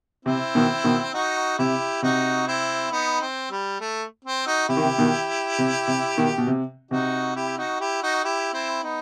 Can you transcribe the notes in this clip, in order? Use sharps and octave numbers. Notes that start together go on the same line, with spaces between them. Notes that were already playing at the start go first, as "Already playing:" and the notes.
C3 C4 E4
B2 D#3
B2 D#3
D#4 F#4
C3 E4 G4
C3 D#4 F#4
C4 E4
B3 D#4
C4
G3
A3
C4
D#4 F#4
C3 E4 G4
D#3
C3
B2 D#3
C3
C3
B2 D#3
B2
C3
C3 D#4 F#4
E4 G4
D#4 F#4
E4 G4
D#4 F#4
E4 G4
C4 E4
B3 D#4